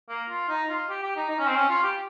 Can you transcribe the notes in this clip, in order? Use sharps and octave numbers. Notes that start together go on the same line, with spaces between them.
A#3
F4
D#4
F4
G4
G4
D#4
D#4
C#4
C4
C#4
F4
G4